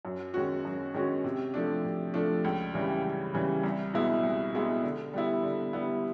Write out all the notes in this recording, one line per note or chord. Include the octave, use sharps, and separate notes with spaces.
F#2
D#3 G#3 C#4 F#4
F#2
D#3 G#3 C#4 F#4
C3
F3 A3 D4
C3
F3 A3 D4
C#2
C#3 E3 G3
C#2
C#3 E3 G3
C2
B2 G#3 B3 E4
C2
B2 G#3 B3 E4
D3
G3 B3 E4
D3
G3 B3 E4